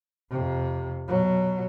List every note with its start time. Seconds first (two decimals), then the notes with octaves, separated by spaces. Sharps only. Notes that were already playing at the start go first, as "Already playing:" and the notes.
0.31 F2 C3
1.08 B2 F#3